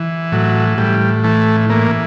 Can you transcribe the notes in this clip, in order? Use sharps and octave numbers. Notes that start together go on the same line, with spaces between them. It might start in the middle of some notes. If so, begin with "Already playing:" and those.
Already playing: E3
A2 F#3
A2 G3
E3 A3
E3 A#3